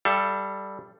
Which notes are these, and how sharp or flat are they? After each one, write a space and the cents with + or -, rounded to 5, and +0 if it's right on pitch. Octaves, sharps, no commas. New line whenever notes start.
G3 +0 A4 +0 F5 -45